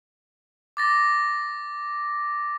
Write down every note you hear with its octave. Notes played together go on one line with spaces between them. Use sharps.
D6 A6 A#6